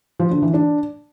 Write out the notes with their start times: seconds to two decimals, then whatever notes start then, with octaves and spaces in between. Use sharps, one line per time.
0.20 F3
0.31 D3
0.42 E3
0.54 D4